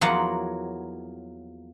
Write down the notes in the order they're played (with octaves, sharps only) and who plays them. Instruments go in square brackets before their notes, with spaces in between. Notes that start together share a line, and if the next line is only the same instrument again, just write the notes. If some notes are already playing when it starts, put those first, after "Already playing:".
[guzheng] E2 F3 F#3 A#3 F#5